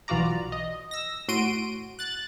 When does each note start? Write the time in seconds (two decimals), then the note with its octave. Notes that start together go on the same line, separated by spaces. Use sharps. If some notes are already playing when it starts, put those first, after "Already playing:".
0.08 B1 E3 F4 F#4 D5 A#5
0.52 D#5
0.91 E6 A#6
1.28 A2 F#4 C6 D7 D#7
1.99 F#6 A6